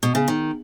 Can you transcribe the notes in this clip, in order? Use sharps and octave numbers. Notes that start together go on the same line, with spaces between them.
B2
C#3
D#3